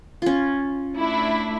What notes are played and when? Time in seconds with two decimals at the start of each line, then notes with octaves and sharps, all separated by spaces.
0.22 C#4 F4
0.97 A3 D4 E4